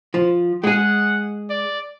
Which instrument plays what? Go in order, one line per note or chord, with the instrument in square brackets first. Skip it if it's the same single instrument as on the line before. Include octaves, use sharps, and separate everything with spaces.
[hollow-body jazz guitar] F3
[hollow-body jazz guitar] G#3 G#4 [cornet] F#5
[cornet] D5